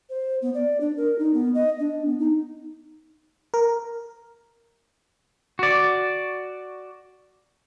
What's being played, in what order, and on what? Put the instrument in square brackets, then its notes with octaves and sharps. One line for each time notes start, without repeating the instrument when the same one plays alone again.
[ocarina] C5
B3
D5
D4
A#4
D#4
B3
D#5
D4
B3
D#4
[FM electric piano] A#4
[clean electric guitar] F#4 D5